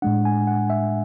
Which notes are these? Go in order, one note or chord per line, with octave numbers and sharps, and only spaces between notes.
A2 G#3 D4 F#5
G#5
F#5
E5